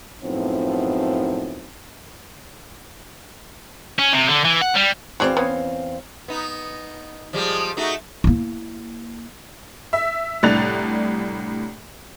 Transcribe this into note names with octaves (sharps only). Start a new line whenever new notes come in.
F#2 A2 F3 B3 C4 D#4
C#4
C3
D3
E3
F#5
G3
E2 C4 F#4 G#4 D5 F5
B3 C#4
B3 D#4
F3 G3 G#3
A3 D#4 F#4
A#3 E4
E5
C2 A2 D4 F#6 A6 F7